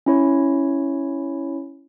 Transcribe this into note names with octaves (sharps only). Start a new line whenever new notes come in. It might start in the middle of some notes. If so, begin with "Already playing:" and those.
C#4 E4 C#5